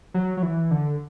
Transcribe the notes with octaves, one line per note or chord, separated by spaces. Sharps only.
F#3
F#3
E3
D3